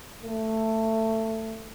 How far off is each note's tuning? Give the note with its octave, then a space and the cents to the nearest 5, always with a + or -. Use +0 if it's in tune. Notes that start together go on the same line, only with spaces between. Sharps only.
A3 +15